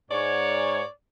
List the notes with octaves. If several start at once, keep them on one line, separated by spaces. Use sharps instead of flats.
G#2 C#5 D5